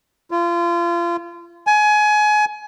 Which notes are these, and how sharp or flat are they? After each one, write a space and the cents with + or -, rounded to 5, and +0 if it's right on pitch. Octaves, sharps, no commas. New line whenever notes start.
F4 -30
G#5 +25